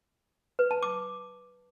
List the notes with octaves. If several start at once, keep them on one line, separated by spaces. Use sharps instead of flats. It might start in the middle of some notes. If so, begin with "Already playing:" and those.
B4
A5
D6